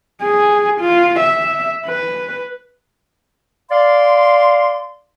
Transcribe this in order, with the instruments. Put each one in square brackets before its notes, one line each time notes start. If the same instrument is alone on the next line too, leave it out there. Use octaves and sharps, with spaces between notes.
[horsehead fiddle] G#4
F4
E5
B4
[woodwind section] D5 F5 C6